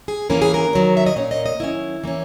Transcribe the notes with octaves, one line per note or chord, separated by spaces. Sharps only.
G#4
E3 A#3 C#4 A#4
G#4
A#4
D#3 F#3 C#4
E5
D#5
A#2 A#3 C#4 C#5
D#5
D#5
D#3 F#3 C#4 E4
E3 A#3 C#4